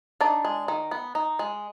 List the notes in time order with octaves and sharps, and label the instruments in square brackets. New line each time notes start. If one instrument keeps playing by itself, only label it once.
[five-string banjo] D4 D#4 D5
G#3
D#3
B3
D#4
G#3